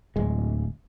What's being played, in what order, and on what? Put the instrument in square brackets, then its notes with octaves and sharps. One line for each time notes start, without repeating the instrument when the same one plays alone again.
[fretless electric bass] D1 G#3